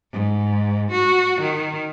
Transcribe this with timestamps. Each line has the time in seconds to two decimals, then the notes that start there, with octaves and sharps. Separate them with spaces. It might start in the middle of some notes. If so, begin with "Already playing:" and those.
0.12 G#2
0.91 F#4
1.41 D#3